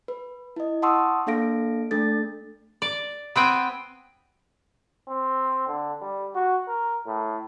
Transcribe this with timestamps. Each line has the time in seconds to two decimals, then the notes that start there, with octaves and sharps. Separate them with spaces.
0.08 B4
0.56 E4 D#5
0.82 F#5 A5 C6 C#6 D#6 E6
1.27 A#3 D4 A4 F5 A#6 D7
1.91 A3 D4 A4 A6
2.82 D5
3.36 B3 C4 G5 G#5
5.08 C4
5.68 D3
6.02 G3
6.35 F#4
6.68 A#4
7.06 A2